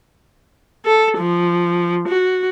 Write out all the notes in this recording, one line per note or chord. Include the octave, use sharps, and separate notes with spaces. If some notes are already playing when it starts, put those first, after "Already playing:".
A4
F3
F#4